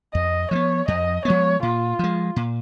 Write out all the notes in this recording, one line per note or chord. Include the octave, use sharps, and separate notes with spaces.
F2 D#5
F3 G#3 B3 C#5
F2 D#5
F3 G#3 B3 C#5
A#2 F4
F3 G#3
A#2